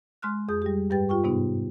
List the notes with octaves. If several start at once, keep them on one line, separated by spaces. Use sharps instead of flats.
G#3 C6 F6 F#6
F2 G#4 D#6 G6
G3 G4
G2 G3 G4 B4 G5 A6
F4 G4 G5 C#6
G#2 C3 B3 D#4